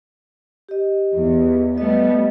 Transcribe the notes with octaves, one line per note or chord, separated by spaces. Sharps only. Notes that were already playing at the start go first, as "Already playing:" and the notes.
G4 D#5
E2
G3 A3 B3 D#5